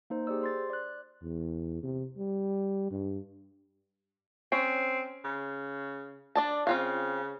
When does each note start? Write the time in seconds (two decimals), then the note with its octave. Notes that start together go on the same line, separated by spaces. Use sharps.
0.10 A#3 D#4 C5
0.27 G4 G#4 C5 D5 E6
0.41 C5 C6 A6
0.70 D5 F#6
1.23 E2
1.83 C3
2.18 G3
2.91 G2
4.52 C4 C#4
5.25 C#3
6.35 D4 D5 A5
6.67 C#3 C4 F4 F5